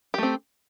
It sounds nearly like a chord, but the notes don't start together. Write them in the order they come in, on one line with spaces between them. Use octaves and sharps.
G4 A3 C4